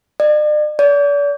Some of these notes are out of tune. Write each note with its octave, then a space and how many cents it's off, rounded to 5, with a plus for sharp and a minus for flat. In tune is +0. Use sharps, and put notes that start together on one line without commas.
D5 +45
D5 -40